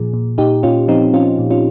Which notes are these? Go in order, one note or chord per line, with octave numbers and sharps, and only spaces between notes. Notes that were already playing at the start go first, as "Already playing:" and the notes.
Already playing: A#2 F3 G#4
A#2
A#2 D#4 G4
A#2 C#4 F4
F3 C4 D#4
F3 C#4 F4
A#2
C#4 F4